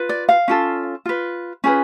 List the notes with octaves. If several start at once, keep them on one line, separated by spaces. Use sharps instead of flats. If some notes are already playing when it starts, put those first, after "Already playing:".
Already playing: F4 B4
D5
F5
C#4 F4 A4
F4 B4
C#4 F4 G#4 B4